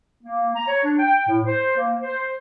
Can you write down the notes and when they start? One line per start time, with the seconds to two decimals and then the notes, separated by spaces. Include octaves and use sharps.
0.23 A#3
0.55 A#5
0.68 C#5
0.84 D4
0.99 G5
1.27 A2
1.45 C5
1.76 A#3
2.01 C5